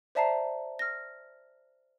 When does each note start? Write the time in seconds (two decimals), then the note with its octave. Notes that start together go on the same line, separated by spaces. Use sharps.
0.15 C5 D5 E5 A5 A#5 C7
0.79 F6 A#6